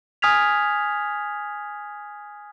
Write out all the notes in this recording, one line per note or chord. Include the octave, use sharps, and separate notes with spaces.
G#5 D#6 F6 G#6 B6 F7